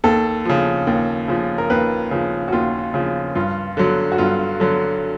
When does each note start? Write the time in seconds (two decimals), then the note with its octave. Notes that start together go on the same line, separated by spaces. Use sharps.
0.04 D#2 A4
0.45 C#3 F3
0.87 D#2
1.28 C#3 F3
1.58 A#4
1.70 D#2 B4
2.11 C#3 F3
2.48 F#4
2.53 D#2 F4
2.94 C#3 F3
3.35 G2 F4
3.77 D3 F#3
4.12 F#4
4.18 G2 F4
4.60 D3 F#3